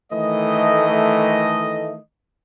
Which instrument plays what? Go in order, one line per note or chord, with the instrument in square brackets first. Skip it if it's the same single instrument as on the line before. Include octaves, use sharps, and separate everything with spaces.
[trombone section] D#3 E3 A3 [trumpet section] D#5